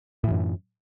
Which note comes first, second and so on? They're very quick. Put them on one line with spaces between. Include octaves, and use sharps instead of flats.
A2 E3 F#2